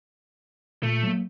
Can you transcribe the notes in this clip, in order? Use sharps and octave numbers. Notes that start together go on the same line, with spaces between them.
A#2 A3
F#3 A#3